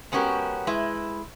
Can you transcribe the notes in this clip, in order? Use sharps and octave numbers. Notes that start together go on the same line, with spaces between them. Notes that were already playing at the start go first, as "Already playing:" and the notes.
G#3 B3 C#4 F#4 G4 A#4
G#3 E4 B4